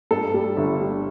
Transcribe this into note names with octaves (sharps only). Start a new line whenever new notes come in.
G2 A4
G3
G1
G3